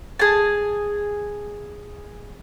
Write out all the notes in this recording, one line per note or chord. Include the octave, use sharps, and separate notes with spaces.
G#4 A5